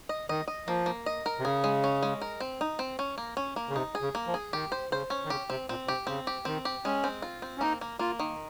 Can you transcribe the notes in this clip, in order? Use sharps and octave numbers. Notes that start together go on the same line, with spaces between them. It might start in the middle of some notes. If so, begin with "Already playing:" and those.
D#5
D#3 D#5
D#5
F3 A#3
A#3
D#5
A#4
C3
C#3 G#4
G#3
C#4
G#3
A#4
C4
D#4
C4
C#4
A#3
C#4
A#3
C#3
C3 D#4
G#4
C#3
A#3
F3
G#4
D#3 G4
C5
C#3 C5
C#4
D#3
C#3 G4
C3 C4
A#2 C4
C3 G4
C#3 C4
G4
D#3 C4
G4
G#3 C#4
C4
F4
C4
C#4
A#3 D#4
A#3
A#3 F4
D#3